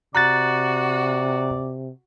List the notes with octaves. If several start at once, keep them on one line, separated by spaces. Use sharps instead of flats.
C3 F#4 D5 A#5 F#6 A6